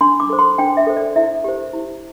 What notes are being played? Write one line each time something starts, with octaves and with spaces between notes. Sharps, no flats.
D4 C6
D6
A4 C5
C6
D4 G5
E5
A4 C5
D5
E4 E5
G4 C5
E4